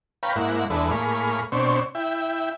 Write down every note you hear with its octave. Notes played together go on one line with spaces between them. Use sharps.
B4 C#5 F5 G5 A#5 B5
G#2 A#3 E4 F#5
E2 G#3 D4 A4 B4 E5
A2 A#3 G#4 B5 C#6 F6
B2 C4 D4 C5 C#5 C#6
E4 E5 G5